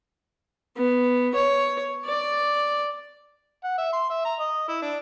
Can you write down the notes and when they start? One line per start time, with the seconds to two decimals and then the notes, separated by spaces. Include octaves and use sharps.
0.77 B3
1.35 C#5
2.05 D5
3.64 F#5
3.78 E5
3.93 C6
4.10 E5
4.25 A#5
4.40 D#5
4.69 E4
4.82 D4